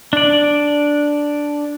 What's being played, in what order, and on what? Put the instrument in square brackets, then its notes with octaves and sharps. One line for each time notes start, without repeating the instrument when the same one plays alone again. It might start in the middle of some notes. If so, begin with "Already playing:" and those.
[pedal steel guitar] D4 D5